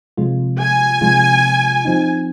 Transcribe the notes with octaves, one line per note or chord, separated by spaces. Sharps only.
C3 F3 G#3 F4
G#5
C3 F3 G#3 F4
F3 C4 D#4